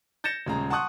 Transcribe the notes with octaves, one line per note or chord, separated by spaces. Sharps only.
G6 A6 A#6 C#7 E7
D#1 C#3 G#3 A#5
F#5 A5 C6 C#6 D#6 F#6